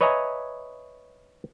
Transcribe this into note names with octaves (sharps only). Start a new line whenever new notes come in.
B4 C#5 D#5 E5 G#5 A#5